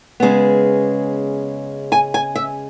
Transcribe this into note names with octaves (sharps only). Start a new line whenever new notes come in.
C#3 G#3 B3
G#5
G#5
E5